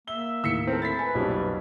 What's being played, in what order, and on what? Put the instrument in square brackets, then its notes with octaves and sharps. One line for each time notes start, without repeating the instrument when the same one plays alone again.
[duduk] A#3 [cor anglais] E5 [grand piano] G7
[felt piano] D#2 A2 [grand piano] E6 B6 C#7
[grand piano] C4 A4 [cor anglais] A#4
[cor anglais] E4 [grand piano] A6 B6
[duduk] B4 [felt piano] G#5
[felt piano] B1 A#2 A5 [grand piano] F2 G3 C#4